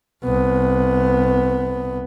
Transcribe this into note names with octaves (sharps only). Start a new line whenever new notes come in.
C2 B3